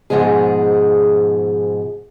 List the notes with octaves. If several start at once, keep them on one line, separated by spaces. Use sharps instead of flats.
G#2 B2 F3 G#3 G#4